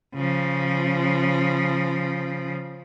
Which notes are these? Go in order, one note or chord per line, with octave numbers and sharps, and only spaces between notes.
C#3 F3